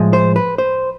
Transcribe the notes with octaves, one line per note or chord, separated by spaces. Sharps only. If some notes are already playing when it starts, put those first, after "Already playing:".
Already playing: A2 F3 G#3
C5
B4
C5